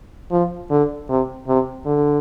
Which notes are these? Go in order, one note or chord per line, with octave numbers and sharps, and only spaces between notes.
F3
D3
C3
C3
D3